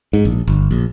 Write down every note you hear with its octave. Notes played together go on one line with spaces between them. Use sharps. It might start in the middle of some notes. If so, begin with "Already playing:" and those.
G#2
A#1
G1
A#1